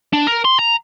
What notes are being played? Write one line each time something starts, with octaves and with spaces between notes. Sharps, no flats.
D4
A#4
C6
A#5